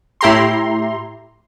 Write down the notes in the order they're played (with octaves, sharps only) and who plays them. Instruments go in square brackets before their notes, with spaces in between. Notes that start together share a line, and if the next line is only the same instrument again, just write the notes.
[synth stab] A2 E4 G4 A#5 C6